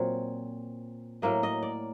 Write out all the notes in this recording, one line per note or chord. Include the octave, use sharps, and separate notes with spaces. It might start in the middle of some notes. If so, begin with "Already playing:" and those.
Already playing: A#2 F#3 C4
A2 F#3 A#3 D#5
D#5
D5